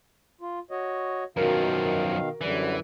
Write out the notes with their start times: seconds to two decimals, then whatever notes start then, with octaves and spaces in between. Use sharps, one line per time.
0.41 F4
0.71 F#4 C#5 D#5
1.37 F#2 B2 D#3 F3 F#4 A#4 F5
2.41 F#2 D3 E3 G3